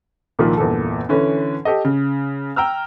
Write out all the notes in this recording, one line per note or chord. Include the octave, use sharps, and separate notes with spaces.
C2 A#2 D#3 F3
G1 E2 A#2 A4
D3 E3 C#4 B4
G4 A4 D#5
C#3
G5 A#5 E6 F6